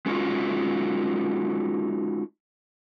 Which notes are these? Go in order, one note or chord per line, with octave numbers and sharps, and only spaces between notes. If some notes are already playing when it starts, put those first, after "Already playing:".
G#3 C#4 D#4 F4 F#4 D#5